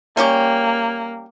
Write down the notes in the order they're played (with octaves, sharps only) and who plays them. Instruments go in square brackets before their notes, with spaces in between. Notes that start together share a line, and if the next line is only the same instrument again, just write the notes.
[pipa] G3 C#4 G4 [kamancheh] A#3